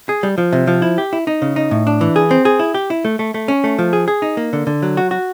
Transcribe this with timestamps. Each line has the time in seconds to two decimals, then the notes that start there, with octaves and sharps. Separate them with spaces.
0.09 G#4
0.23 G3
0.38 F3
0.53 C3
0.67 F3
0.82 E4
0.98 G4
1.13 E4
1.27 D#4
1.42 C#3
1.56 D#4
1.71 A2
1.87 D4
2.01 E3
2.16 G#4
2.31 C4
2.45 G#4
2.59 E4
2.74 G4
2.90 E4
3.05 A3
3.19 A3
3.34 A3
3.48 C#4
3.64 A3
3.79 F3
3.93 G#4
4.08 G#4
4.22 D#4
4.37 A#3
4.53 D3
4.67 D3
4.82 F#3
4.97 F#4
5.11 F#4